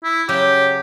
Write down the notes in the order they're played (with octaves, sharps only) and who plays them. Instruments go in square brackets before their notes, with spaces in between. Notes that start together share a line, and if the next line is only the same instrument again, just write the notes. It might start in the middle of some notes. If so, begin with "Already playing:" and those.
[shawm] E4
[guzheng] C#3 F#3 [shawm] G4